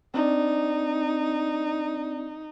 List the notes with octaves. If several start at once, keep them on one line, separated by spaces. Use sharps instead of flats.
C4 D4 D#4 D5